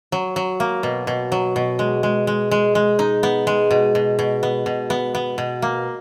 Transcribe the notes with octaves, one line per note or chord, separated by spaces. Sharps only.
F#3
F#3
A#3
B2
B2
F#3
B2
G#3
G#3
G#3
G#3
G#3
D#4
B3
G#3
B2
B2
B2
B3
B2
B3
B3
B2
A#3